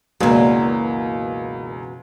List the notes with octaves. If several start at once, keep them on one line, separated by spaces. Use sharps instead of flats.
C#2 F#2 B2 E3 F#3 A#3 D4 A#4